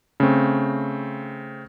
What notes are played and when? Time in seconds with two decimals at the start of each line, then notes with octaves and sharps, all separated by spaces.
0.20 C#3 A3 C4